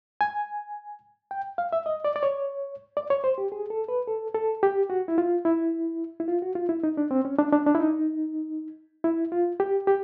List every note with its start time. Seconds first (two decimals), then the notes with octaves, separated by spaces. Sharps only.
0.21 G#5
1.31 G5
1.58 F5
1.73 E5
1.86 D#5
2.05 D5
2.16 D5
2.23 C#5
2.97 D5
3.10 C#5
3.24 C5
3.38 G4
3.52 G#4
3.70 A4
3.89 B4
4.07 A4
4.34 A4
4.63 G4
4.90 F#4
5.08 E4
5.18 F4
5.45 E4
6.20 E4
6.28 F4
6.42 F#4
6.55 F4
6.69 E4
6.84 D#4
6.97 D4
7.11 C4
7.25 C#4
7.38 D4
7.52 D4
7.66 D4
7.75 E4
7.80 D#4
9.04 E4
9.32 F4
9.60 G4
9.87 G4